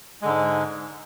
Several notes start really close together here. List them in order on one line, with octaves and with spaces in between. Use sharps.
G#3 D3 G#2